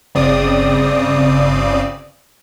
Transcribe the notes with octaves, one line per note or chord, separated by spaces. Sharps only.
G1 C#3 C4 D5 D#6